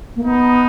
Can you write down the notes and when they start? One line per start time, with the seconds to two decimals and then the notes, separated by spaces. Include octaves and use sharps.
0.16 A#3
0.24 B3 D#4